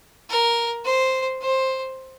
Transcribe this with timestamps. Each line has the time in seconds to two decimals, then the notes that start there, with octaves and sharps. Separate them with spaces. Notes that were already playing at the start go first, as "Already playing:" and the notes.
0.29 A#4
0.85 C5
1.41 C5